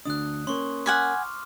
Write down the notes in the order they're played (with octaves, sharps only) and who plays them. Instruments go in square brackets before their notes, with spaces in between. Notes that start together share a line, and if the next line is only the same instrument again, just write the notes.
[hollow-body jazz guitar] D2 D4 [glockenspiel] D#6 F#6
[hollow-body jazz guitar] A#3 C#4 [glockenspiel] C6 C#6
[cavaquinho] F#5 G#5 B5 [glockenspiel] C6 D6 F6